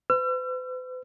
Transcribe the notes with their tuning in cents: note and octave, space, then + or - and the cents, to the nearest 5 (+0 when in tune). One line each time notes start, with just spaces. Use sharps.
B4 +45 E6 +45